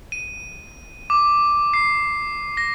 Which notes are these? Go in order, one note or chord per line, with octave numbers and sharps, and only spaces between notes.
D#7
D6
C7
A#6